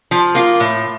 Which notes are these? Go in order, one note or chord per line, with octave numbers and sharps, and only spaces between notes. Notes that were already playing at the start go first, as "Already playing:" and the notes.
F3
A#3 F4
A2